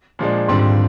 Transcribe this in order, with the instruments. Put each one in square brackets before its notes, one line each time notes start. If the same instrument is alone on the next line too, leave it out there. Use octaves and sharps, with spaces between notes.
[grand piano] A#2 F3 G#3 D4
[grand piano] D#2 D3 G3 C4 F4 [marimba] G#2
[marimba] G#2